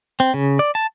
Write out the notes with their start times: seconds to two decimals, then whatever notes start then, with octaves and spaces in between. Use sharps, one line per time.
0.20 C4
0.34 C#3
0.59 D5
0.75 A5